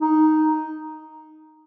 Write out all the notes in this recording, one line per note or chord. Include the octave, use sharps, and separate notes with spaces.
D#4